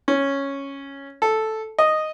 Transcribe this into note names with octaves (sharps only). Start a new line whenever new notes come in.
C#4
A4
D#5